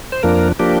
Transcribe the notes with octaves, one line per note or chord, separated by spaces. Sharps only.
C5
F2 F3 A#3 D4 A#4
F3 A#3 D4 G4